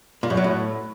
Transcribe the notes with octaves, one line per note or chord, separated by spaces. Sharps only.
A#2
F#2
F#3
A2